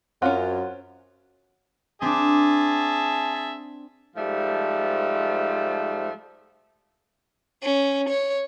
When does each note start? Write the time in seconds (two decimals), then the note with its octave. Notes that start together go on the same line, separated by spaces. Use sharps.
0.22 F#2 C4 C#4 F4 F#5
2.02 C4 D4 G#4 E5 A5
4.16 G#2 F3 G3 A3
7.62 C#4
8.09 C#5